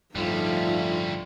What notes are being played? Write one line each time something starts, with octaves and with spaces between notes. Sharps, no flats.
D1 G2 D3 F3 G3 A3 D#4 F4